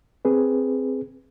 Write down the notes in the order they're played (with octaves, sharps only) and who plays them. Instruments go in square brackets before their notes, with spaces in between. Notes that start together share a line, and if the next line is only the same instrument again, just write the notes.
[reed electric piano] C4 G#4 B4